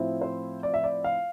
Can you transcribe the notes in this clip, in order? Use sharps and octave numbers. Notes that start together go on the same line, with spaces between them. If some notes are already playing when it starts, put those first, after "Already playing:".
Already playing: A2 F3 C4 E4
C5
D5
E5
D5
F5